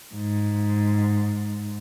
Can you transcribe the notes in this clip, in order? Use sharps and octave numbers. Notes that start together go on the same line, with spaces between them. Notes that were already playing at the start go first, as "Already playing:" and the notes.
G#2